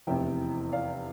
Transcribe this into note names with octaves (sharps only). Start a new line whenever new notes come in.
F1 E2 C3 E5 G5
D5 F5